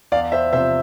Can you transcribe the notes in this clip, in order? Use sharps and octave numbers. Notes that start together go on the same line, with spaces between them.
E2 D5 F5
C5 E5
C3 F3 C5 E5